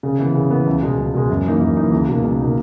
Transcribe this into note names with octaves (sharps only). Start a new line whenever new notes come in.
C#3
E3 B3
C#3
E3 B3
C#2
B2 G#3
C#2
B2 G#3
F#2
E3 A#3 D#4
F#2
E3 A#3 D#4
C#2
B2 A#3 D#4
C#2
B2 A#3 D#4